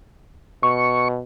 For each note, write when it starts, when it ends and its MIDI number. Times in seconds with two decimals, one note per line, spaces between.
0.63 1.21 47
0.63 1.08 85